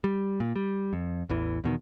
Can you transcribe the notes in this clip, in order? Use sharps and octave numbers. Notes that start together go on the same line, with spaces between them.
G3
A#2
G3
F2
A1 E2 E3
E2 B2 D#3